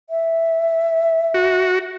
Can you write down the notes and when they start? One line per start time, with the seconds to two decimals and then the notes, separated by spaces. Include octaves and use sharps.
0.10 E5
1.34 F#4